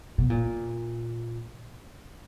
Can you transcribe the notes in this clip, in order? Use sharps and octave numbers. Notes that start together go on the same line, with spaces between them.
B2
A#2